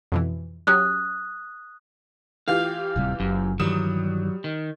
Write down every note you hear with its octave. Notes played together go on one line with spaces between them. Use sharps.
F2 B2 E3
F#3 C#4 G4 D#6 F#6
E3 F4 G4 F5
D1 C3 G3
F#1 F#2
G2 D#3 E3 F#3 G3 D#6 E7
D#3